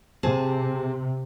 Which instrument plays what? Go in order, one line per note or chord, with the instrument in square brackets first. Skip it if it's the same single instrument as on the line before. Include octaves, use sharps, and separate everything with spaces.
[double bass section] C3 [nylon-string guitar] C4 G#4 A5